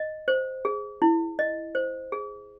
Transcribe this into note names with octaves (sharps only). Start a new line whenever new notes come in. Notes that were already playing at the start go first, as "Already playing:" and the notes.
Already playing: D#5
C5
G#4
E4
D#5
C5
G#4